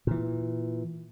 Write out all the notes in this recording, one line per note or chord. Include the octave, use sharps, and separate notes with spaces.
A#2 E3